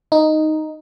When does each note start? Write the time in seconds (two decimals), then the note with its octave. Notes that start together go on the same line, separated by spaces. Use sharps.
0.12 D#4